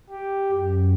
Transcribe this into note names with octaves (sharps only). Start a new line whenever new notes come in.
G4
F#2